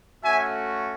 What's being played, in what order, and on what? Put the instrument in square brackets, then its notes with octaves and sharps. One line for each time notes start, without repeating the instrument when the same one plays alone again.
[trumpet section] A3 C#4 F#4 E5 G#5